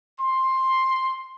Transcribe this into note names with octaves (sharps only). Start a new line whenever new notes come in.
C6